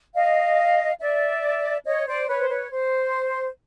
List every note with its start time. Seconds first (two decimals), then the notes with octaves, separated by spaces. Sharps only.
0.15 D#5 F5
1.00 D5 E5
1.85 C#5 D#5
2.06 C5 D5
2.28 B4 C#5
2.39 C5
2.49 B4 C#5
2.70 C5